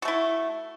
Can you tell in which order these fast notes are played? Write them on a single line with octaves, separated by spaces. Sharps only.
F#4 A3 E4